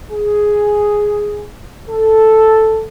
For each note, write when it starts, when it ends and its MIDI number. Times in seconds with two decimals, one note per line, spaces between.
0.11 1.47 68
1.89 2.87 69